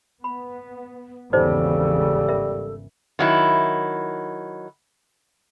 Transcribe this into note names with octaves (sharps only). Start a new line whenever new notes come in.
B3 B5
G#1 E2 C#3 G3 D#4 A4 C5 D#5
A#4 E5
D#3 F#3 E4